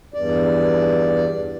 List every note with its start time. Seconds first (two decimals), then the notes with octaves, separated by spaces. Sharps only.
0.14 E2 G2 D5